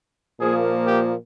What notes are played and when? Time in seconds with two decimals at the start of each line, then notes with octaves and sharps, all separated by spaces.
0.40 A#2 F3 A#3 G#4
0.88 G4